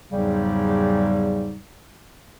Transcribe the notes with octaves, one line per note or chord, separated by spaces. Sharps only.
E2 G#2 C#3 F#3 G3